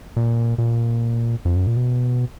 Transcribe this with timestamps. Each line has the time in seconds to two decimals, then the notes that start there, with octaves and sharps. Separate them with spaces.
0.17 A#2
0.58 A#2
1.45 F2
1.56 F#2
1.67 A#2
1.77 B2